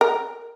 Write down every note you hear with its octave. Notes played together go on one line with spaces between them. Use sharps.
A#4